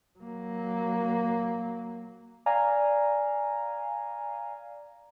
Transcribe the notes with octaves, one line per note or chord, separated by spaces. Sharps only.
F#3 A#3
D5 F5 G#5 A#5